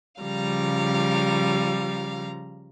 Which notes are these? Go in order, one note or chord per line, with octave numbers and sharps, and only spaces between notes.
C#3 F3 G3 F5 A#5